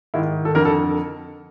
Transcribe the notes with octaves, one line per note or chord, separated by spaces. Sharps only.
G#2 D#3 E4
A4
F2 D3 A#4
A4